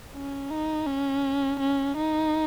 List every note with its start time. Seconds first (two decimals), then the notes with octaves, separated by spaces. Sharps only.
0.14 C#4
0.50 D#4
0.86 C#4
1.60 C#4
1.97 D#4